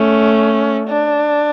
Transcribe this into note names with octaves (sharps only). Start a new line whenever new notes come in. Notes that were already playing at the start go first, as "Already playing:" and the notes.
Already playing: A3 C#4
D4